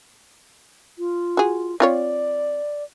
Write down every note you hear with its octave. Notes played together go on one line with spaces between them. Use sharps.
F4
F#4 G#4
C4 F4 C#5 D5